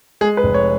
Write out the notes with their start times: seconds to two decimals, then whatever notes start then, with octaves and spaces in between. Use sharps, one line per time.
0.21 G#3 G#4
0.37 B4
0.43 F1
0.54 C#5